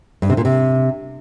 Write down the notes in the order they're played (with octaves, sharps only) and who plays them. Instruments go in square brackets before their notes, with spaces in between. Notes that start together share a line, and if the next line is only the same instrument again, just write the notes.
[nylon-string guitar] G2
C3
A#2
C3